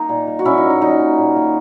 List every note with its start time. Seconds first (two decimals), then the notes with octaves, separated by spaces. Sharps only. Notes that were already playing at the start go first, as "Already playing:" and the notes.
Already playing: A#3 D#4
0.09 A#2
0.27 A#3
0.39 F#4
0.45 A#2 C#4 E4
0.58 D#4
0.64 A#3
0.70 D#4
0.82 A#2 D#4
1.00 A#3
1.18 A#2
1.36 A#3